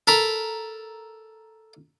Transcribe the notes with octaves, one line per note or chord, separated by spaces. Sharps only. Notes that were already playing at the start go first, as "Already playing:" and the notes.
A4 A#4 B5